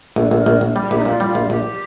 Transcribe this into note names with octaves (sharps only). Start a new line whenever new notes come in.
A#1 A4
A#1
A#4
A#1
A#1
G3
G4
A#1
D#4
A#2 F4
G3
F4
A#1
A#1 G4